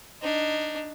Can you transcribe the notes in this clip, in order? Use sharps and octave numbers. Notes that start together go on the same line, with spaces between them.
D4 D#4